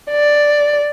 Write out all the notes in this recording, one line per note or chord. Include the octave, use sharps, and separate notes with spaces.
D5